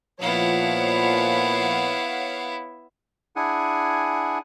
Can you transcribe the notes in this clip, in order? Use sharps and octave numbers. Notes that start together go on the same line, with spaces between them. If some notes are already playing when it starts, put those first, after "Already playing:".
A#2 F3 B3 E4 C#5 F5 F#5
D4 E4 G#4 F#5 G#5